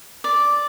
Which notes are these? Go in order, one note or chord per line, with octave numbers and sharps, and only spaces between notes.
D5